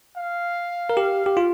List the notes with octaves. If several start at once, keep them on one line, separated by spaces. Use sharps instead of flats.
F5
A#4
G4
G4
F4